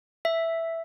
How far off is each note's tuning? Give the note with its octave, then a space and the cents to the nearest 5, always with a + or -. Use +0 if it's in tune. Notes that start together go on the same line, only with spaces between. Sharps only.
E5 +0